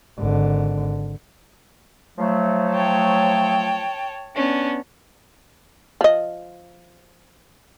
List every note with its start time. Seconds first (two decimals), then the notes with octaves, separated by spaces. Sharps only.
0.18 G#1 D3
2.18 F3 F#3 A3
2.72 C#5 G5 A5
4.35 B3 C#4 D4
6.01 F3 D#5